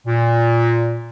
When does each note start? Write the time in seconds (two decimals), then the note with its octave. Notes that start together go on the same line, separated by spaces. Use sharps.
0.07 A#2